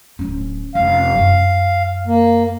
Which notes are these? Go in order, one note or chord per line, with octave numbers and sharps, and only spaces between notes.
D1 C#4
F1 C#4 F5
F#2
A#3